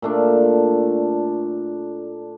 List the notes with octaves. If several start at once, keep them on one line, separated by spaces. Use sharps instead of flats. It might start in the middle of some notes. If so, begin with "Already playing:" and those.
A#2 A3 D4